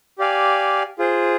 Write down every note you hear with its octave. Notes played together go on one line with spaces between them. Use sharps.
G4 D5 F5 G#5
F4 G#4 C5